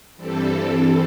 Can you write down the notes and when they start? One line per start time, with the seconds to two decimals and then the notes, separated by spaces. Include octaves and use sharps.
0.17 G2 E3 G3 C4 A4